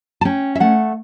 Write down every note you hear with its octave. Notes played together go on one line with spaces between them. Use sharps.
A5
C#4 G5
E5
A3 F#5